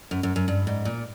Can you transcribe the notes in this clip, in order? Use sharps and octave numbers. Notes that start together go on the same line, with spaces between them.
F#2
F#2
F#2
G2
G#2
A#2